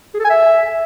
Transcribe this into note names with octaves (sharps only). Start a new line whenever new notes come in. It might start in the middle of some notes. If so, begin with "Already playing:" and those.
G#4
A4
G#5
E5